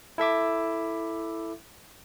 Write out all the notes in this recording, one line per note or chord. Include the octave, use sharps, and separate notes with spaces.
E4 A4 E5 D6